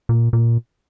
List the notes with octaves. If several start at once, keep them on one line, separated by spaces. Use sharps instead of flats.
A#2
A#2